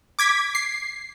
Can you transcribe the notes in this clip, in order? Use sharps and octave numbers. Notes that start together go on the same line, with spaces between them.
D6 G#6 B6
C7